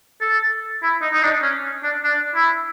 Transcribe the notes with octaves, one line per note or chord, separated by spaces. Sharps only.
A4
E4
D#4
D#4
D4
C#4
D4
D4
E4